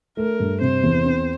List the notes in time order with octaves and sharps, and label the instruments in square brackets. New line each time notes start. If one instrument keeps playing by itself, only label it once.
[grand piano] A3 [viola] A#4
[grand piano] G2
[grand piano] C3 [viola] C5
[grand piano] E2
C4